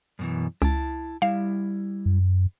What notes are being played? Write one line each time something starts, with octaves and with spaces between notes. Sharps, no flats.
F#2 B2 E3
C#2 E4 A5
G3 E4 F5
F#2